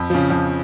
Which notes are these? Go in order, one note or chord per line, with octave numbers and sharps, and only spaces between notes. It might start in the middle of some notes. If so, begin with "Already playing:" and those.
Already playing: F2 B5
C#3 F3
F2